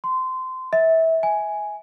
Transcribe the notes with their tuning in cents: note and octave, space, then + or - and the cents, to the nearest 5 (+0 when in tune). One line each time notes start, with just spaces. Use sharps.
C6 -20
E5 -25
G#5 +5